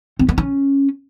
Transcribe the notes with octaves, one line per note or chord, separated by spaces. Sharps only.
C4
B3
C#4